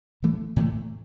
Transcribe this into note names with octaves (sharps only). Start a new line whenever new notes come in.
A2 E3 A3
A2 E3 A3